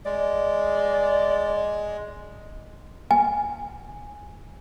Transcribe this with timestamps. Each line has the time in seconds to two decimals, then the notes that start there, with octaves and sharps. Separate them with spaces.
0.06 G#3 D5
3.11 G#5